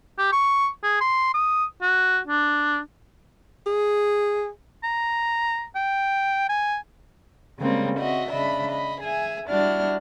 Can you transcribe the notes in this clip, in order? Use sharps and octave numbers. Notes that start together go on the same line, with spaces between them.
G4
C#6
G#4
C6
D#6
F#4
D4
G#4
A#5
G5
G#5
C#3 G3 G#3 A#3 C4
C4 F#4 D#5 E5
C#3 D4 D#5 E5 B5
D#5 B5
G#4 E5 G#5
G3 D4 E4 F#4 F6